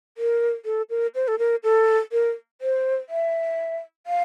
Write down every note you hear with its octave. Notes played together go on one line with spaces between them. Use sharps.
A#4
A4
A#4
C5
A4
A#4
A4
A#4
C5
E5
F5